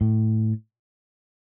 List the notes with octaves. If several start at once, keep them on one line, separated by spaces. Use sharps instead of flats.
A2